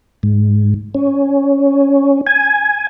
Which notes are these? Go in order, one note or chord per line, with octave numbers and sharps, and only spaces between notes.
G#2
C#4
G#5